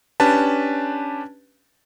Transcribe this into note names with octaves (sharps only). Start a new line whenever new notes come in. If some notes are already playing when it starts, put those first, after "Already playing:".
C#4 D4 G4 B4 A5